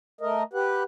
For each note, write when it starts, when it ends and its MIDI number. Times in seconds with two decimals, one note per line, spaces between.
0.21 0.43 57
0.21 0.43 70
0.21 0.43 75
0.53 0.83 67
0.53 0.83 71
0.53 0.83 78